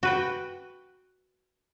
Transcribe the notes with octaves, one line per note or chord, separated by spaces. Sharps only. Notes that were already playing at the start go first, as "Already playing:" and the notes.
F#4 B4 G5